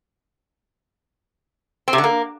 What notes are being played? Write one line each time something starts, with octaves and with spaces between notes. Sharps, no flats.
C4
C3
D3
A#3